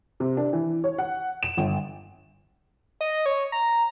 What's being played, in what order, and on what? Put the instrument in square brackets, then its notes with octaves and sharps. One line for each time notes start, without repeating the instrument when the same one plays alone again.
[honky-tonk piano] C3
D4
E3
C#5
F#5
E7
G1
[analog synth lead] D#5
C#5
A#5